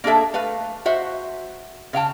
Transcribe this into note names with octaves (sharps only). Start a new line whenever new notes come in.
A#3 D4 G#4 A4 E5
A3 B4 F5
F#4 C5 E5
C#3 F5 G5 A5